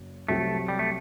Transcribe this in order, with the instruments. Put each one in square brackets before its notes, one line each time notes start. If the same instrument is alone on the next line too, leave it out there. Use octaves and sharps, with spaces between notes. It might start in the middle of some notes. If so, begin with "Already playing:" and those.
Already playing: [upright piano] F#1
[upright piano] C2 C3 F#3 C4 G4 [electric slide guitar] A3
[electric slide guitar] G3
A3